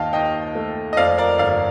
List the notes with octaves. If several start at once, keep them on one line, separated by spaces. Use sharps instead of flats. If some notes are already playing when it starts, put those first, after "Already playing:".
Already playing: D#2 D#3 D#5 F5 G5 A5
D#2 D#5 G5
A3
D#5
F2 D5 F5
A#4 D5
G1 D5 F5